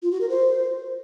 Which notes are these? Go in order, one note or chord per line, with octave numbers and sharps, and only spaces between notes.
F4
F#4
A#4
C5